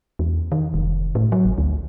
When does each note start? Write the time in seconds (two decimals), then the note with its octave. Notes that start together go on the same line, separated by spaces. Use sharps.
0.19 E2
0.52 D#3
0.74 F1
1.15 A2
1.32 F#3
1.45 G#1
1.58 D2